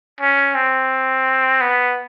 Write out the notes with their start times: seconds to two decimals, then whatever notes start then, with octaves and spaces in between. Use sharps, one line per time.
0.21 C#4
0.55 C4
1.61 B3